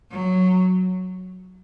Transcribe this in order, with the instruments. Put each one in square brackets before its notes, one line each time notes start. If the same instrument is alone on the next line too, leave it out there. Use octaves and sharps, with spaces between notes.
[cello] F#3